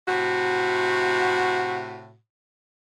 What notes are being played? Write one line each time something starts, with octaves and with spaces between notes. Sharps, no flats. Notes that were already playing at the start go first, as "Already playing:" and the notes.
A2 C3 F#4